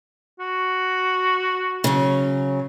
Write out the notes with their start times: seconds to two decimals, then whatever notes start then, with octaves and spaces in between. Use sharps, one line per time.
0.40 F#4
1.84 C#3 F#3